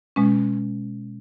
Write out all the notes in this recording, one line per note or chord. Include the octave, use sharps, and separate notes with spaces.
B2 G#3 C#4